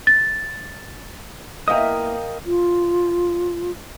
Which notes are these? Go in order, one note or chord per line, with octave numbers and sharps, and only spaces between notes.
A6
A#3 B3 E4 A#4 D#5 F5 G5 D#6
F4